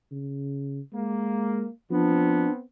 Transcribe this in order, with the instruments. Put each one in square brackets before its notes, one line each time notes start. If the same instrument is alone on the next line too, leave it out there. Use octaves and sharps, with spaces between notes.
[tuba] C#3
[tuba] G#3 [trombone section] A#3
[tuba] F3 [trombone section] B3 C4 [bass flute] D4